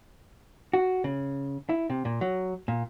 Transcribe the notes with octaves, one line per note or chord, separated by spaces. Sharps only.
F#4
C#3
E4
C3
A#2
F#3
A#2